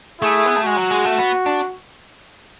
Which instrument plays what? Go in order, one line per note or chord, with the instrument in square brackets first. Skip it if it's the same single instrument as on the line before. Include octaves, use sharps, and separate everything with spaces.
[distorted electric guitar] A3 [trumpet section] E4 G#4
[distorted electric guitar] B3
A3
[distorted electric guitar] G#3 [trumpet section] F#4
[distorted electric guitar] F#3
G#3
A3
B3
D4